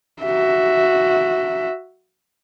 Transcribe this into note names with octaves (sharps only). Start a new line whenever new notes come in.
F#4 E5